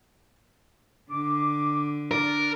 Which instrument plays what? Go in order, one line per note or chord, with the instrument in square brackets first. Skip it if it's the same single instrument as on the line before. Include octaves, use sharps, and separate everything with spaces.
[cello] D3 [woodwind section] D6
[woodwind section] D4 D5 [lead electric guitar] A#4